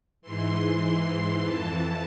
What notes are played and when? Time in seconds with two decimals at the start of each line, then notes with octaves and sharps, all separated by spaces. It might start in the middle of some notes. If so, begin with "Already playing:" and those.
0.22 G#2 E3 C6
1.42 F2 E3 A5